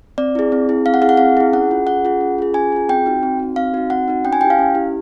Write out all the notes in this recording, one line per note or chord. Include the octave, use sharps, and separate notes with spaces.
C4 D5
E4 G#4
C4
E4 G#4
C4 F5
F#5
E4 G#4 F5
F#5
C4 F5
E4 G#4
C#4 F#5
F4 G#4
C#4 F#5
F4 G#4
C#4
F4 G#4
C#4 G#5
F4 G#4
C4 G5
D#4 F#4
C4
D#4 F#4
C4 F5
D#4 F#4
C4 F#5
D#4 F#4
C#4 G5
G#5
E4 G4 G5
F5
C#4
E4 G4